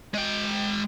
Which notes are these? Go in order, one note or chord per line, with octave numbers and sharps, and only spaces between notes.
G#3 G5